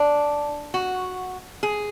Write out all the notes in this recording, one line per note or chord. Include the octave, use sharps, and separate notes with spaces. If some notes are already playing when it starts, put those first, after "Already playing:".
Already playing: D4
F#4
G#4